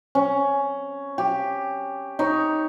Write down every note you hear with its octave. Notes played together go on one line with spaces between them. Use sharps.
C#4
G4
D#4 C#5